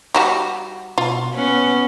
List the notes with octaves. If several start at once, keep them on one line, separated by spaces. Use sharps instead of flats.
G3 F#4 G4
B2 F4
B3 C#4